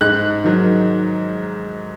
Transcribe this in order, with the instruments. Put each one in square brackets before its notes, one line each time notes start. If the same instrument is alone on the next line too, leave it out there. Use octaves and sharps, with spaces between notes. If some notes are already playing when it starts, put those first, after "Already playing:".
[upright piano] G#2 F#6
D#3 F#3